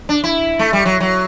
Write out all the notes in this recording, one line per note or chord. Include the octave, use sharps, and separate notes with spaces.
D4
E4
A3
G3
F#3
F#3